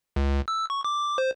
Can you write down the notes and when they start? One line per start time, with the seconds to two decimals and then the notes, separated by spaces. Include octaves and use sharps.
0.16 C#2
0.48 E6
0.70 C#6
0.84 D6
1.18 C5